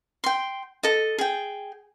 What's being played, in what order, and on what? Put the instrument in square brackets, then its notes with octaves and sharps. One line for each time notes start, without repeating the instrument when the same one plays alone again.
[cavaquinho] G5 C6
A4 D#5
G#4 G5